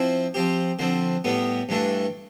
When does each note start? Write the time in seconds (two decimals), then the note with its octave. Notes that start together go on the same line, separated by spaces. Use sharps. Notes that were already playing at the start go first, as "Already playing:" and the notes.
Already playing: F3 C4 E4
0.34 F3 C4 G4
0.79 D3 F3 C4
1.24 A2 G3 B3
1.69 G2 E3 A3 D4